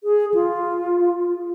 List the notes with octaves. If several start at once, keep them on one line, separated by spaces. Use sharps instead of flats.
G#4
F4